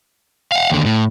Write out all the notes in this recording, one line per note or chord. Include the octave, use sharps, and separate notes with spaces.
F5 F#5
D#2 D3
A2